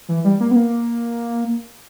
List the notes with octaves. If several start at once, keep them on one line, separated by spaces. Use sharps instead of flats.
E3
G3
A#3
B3
A#3